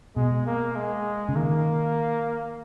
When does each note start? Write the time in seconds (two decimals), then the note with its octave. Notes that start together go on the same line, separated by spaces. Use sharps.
0.16 B2 G#3
0.46 A#3
0.76 G#3
1.29 C#3
1.36 D#3 A#3